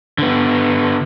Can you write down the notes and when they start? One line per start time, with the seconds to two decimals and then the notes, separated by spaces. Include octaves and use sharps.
0.18 D3 B3